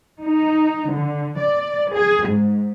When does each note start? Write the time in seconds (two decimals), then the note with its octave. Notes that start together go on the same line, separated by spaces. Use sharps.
0.22 D#4
0.89 D3
1.36 D5
1.91 G#4
2.26 G#2